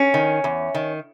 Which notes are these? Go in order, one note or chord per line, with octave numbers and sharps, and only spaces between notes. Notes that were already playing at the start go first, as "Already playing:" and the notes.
Already playing: C#4
D#3
E2
D#3